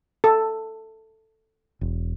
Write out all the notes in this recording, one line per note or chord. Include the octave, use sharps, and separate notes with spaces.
A4
E1